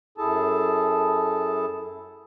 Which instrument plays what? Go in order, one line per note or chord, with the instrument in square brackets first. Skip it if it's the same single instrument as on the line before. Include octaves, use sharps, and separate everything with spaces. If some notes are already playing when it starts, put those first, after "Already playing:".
[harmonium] F#2 E4 G#4 A4 A5